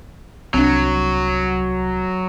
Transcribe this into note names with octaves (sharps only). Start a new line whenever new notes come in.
C2 F#3 C4 D4